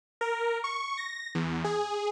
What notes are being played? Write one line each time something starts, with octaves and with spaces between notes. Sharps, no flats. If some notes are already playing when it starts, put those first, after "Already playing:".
A#4
C#6
A#6
E2
G#4